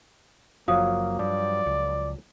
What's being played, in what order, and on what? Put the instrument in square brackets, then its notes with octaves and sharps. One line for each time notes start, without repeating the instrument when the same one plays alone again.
[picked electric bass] F#1 [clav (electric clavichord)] F3 F#3 [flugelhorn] A#3 [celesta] F5 D#6
[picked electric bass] G2 [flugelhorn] D5
[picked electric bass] C#2